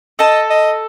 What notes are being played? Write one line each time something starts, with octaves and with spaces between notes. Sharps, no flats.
A4 D#5 A5
D#5